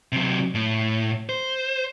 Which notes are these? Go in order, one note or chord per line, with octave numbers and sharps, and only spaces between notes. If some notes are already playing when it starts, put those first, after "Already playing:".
C3 F#3
A2
C5